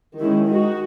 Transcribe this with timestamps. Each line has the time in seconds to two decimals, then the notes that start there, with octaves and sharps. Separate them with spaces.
0.20 D#3 G#3 C#4 E4
0.48 G#3 D#4 F#4